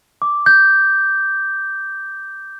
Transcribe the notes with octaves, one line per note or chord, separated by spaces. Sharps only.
D6
G6